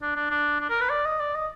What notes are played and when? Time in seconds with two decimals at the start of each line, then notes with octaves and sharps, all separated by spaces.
0.02 D4
0.16 D4
0.31 D4
0.60 D4
0.70 A#4
0.81 B4
0.90 D5
1.05 D#5
1.20 D5
1.35 D#5